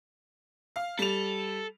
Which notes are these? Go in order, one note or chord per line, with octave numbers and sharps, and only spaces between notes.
F5
G3 A4 F7